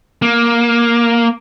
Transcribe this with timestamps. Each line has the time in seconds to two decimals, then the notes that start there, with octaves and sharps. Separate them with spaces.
0.22 A#3